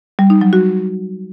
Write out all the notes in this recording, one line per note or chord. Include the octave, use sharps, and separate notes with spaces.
G3
D#4
F#3
F#4